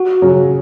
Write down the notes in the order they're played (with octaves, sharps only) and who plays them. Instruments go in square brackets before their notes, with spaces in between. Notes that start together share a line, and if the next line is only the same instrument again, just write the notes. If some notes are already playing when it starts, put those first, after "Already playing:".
Already playing: [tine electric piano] F#4
[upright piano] C#3 F#3